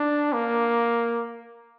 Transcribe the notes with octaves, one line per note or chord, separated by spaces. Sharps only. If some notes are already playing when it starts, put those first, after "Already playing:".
Already playing: D4
A#3